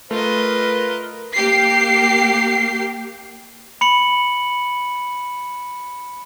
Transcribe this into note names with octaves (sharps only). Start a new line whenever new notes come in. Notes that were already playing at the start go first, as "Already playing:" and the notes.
A3 F4 A#4 B4 D#5
A#3 G4 C7
B5 C#7 F#7